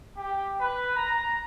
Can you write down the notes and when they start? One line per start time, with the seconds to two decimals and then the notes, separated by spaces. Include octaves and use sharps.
0.16 G4
0.59 B4
0.96 A#5